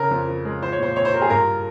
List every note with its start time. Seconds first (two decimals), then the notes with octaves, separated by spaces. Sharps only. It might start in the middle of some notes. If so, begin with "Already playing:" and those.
Already playing: C#3 A#4
0.11 F2
0.28 F3
0.45 G#3
0.62 F3 C5
0.72 C#5
0.79 A#2 C5
0.96 C4 C#5
1.05 C5
1.14 F4 A#4
1.22 G#4
1.30 G2 A#4